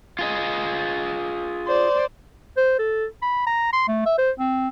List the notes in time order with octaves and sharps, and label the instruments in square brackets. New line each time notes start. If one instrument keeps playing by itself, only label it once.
[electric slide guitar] F4 G#4 D#5
[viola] C5 D5
[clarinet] C5
A4
B5
A#5
C6
A3
E5
C5
C4